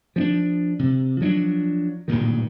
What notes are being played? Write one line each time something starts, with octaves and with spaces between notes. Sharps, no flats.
F3 C4 D4
C3
F3 F#3 B3 D4
D1 G2 A#2 D#3